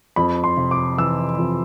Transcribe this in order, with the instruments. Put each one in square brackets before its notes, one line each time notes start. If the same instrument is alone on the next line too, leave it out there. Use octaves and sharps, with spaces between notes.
[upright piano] F2 B5
C6
C3
D6
E3 E6
F2